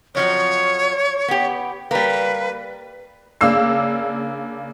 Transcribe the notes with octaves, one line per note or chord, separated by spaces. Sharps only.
F2 F3 F#3 C#5
B3 G4
G3 A#3 B4
C#3 A#3 D4 E6 C7